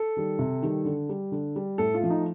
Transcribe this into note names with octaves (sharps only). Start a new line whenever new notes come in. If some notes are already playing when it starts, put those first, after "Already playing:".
Already playing: A4
D#3 G3
C3
D#3 G3
D3
G3
D3
G3
A2 A4
F4
F3 A3
D#4